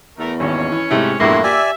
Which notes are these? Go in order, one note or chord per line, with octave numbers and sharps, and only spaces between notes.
E2 A3 A#4
G#1 D#2 C#4 C#5
E3
G#2 C3 A3 E4
A#1 E2 G2 E3 A3 A#3 E4 C6
G4 D5 E5 G#5